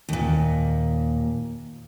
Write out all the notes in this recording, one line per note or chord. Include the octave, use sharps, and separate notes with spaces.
D#2 A#2